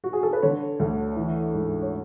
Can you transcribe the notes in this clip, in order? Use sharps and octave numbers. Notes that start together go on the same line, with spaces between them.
F#4
G#4
A4
B4
D3 C#5
D2
E3
G#2
C#5